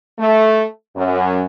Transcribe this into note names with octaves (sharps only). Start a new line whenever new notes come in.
A3
F#2